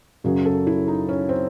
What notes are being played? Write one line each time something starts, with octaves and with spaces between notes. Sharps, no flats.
F#2 C#3 F#3 G#4
A4
E4
D#4
C#4
C4